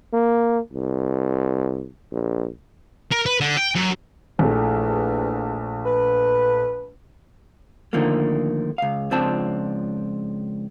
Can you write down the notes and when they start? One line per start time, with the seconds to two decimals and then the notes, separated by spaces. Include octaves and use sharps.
0.13 A#3
0.73 C2
2.12 A#1
3.12 A#4
3.26 B4
3.41 D3
3.57 G5
3.76 F#2
4.39 A#1 E2 A3
5.85 B4
7.93 D3 D#3 F3 A3 A#3
8.78 C#2 F5
9.11 C#2 F3 C4 D4 A5